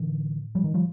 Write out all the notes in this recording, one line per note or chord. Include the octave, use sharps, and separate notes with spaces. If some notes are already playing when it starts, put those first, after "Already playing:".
Already playing: A2 D3 E3
F3 G3
D#3
F3 G3